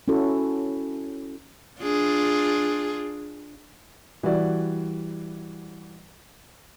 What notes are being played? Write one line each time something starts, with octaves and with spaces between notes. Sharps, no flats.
C#4 E4 F#4 A4
D4 F4 G#4
E3 G3 F#4 D5